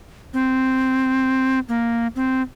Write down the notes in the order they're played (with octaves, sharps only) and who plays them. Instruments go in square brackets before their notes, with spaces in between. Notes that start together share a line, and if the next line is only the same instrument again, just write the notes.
[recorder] C4
A#3
C4